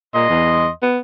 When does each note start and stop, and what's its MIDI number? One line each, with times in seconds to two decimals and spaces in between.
0.15 0.28 46
0.15 0.68 75
0.15 0.68 84
0.29 0.68 40
0.82 0.99 59